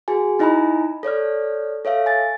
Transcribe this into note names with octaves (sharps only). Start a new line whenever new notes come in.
F#4 G#4 G#5
D#4 E4 D#5 G#5 A#5 B5
A4 C#5 D5 F6
A4 C#5 E5 F5
G#5 A6